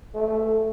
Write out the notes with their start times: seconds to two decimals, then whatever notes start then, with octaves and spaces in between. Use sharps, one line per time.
0.14 A3